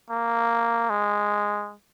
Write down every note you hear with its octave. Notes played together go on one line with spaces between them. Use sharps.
A#3
G#3